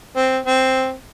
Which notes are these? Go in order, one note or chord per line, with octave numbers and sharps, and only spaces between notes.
C4
C4